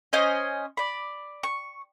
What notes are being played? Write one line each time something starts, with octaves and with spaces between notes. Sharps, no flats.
C#4 C5 D#5 G#5
D5 B5
C#6